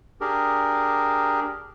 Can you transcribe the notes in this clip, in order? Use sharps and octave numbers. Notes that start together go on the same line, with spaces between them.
D4 G4 G#4 A#4